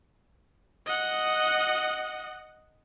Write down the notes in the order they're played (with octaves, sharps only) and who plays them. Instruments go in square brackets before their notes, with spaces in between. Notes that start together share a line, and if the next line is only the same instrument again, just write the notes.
[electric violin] D#5 F#5